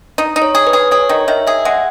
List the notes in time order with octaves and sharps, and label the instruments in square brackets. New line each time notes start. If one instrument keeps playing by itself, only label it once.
[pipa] D#4
D#4
[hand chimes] C#5
[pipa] G#4
[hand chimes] B4
[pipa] G#4
[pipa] G#4 [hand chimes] C#5
[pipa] D#3 [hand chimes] C#5
[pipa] D#3 [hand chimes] E5
[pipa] G#4 [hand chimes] E5
[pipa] G#3 [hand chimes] F#5